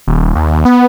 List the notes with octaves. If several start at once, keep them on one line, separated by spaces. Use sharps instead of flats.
D#1
D#2
B3